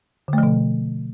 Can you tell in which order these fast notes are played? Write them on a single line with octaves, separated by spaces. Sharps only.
D3 A3 F3 B2